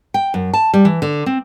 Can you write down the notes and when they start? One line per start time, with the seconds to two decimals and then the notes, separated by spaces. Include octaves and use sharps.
0.14 G5
0.34 F#2
0.53 A5
0.74 G3
0.85 E3
1.02 D3
1.26 C4